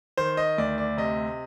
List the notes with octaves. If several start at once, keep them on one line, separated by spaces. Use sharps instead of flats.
D#3 C5
D#5
D2 D5
D5
C3 D#5